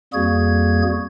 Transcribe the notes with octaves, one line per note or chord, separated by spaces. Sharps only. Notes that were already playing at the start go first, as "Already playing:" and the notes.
F2 G3 A#3 F#4 G#4 G#6